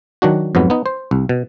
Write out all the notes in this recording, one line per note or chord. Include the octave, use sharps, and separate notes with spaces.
D#3 F#3 D4 F#4
F2 G#2 F#3 B3
B3 D#4
C5
C2
B2